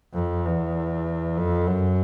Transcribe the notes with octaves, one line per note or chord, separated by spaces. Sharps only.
F2
E2
F2
F#2